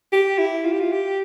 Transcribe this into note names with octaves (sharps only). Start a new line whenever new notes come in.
G4
E4
F4
G4
F4
G4